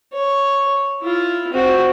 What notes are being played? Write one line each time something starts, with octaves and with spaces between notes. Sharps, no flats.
C#5
E4 F4
C4 F#4